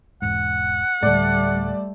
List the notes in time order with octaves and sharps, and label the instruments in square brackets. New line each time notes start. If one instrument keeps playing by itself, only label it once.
[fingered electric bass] E1 G#2 [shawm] F#5
[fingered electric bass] D2 A2 [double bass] G3 A3 [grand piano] D5